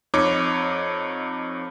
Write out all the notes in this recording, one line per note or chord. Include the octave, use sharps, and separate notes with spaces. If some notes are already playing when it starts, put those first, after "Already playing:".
F2 D#4 C#5 D6